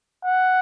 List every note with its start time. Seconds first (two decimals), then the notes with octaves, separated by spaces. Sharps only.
0.25 F#5